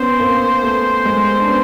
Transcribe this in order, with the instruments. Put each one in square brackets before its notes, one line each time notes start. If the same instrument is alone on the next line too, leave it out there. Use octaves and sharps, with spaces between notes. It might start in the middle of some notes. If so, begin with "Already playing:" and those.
Already playing: [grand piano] B3 C#4 [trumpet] C5
[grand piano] A#3 C4
A3 B3
G#3 A#3
D4
B3 C#4